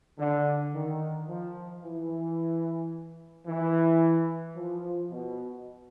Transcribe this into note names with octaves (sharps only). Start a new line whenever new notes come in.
D3
D#3
F3
E3
E3
F3
B2